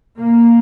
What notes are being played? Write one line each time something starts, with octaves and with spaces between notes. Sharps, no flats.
A#3